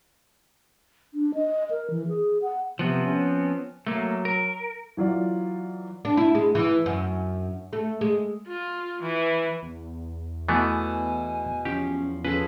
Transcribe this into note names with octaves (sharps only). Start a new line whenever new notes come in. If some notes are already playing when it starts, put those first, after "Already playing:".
D4
D#5
A#4
E3
G#4
F#5
C3 F3 B3 C4
C#4
F#3 A3 A#3
A#4
E3 F#3 F4 D5
D4
E4
G#3
E3
F#2
A3
G#3
F4
E3
E2
B2 E3 A3 B3 G#5
F3 C#4 G4
F3 C#4 G#4 A4 B4